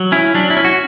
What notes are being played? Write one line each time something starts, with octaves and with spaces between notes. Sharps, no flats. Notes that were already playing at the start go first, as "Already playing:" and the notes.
Already playing: F#3
C#4 E4
F#3 D4
E4
C#4
F#4